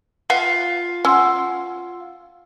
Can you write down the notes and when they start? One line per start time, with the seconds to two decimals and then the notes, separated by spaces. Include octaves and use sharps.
0.30 F4 B4 E5 F#5
1.05 C#4 F#5 C6 E6